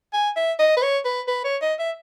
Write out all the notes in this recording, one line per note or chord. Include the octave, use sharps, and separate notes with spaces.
G#5
E5
D#5
B4
C#5
B4
B4
C#5
D#5
E5